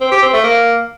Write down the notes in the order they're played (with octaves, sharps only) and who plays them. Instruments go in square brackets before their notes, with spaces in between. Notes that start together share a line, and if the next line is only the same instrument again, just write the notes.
[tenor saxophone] C4
G4
C4
A3
A#3